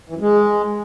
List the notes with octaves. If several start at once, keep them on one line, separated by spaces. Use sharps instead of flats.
E3
F#2
G#3